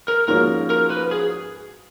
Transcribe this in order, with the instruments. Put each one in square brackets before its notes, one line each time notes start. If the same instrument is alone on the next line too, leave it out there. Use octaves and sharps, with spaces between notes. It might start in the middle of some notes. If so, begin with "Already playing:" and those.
[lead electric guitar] A#4
[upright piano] G#2 F3 A#3 C#4 F#4 [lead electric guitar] A#4
[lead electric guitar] A#4
B4
G#4